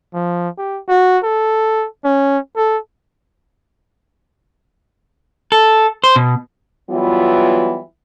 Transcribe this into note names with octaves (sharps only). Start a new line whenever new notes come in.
F3
G4
F#4
A4
C#4
A4
A4
C5
B2
E3 F#3 G3 B3 E4 F4